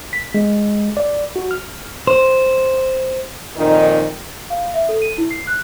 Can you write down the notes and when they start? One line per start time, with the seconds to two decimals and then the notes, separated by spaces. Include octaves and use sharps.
0.13 B6
0.34 G#3
0.97 D5
1.36 F#4
1.51 F6
2.07 C5
3.57 F2 A#2 D#3 D#4
4.50 F5
4.74 E5
4.89 A4
5.02 D#7
5.18 E4
5.31 C7
5.47 F#6